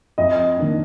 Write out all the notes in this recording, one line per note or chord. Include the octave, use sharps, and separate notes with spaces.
F2 D#5
D#3 A#3 D4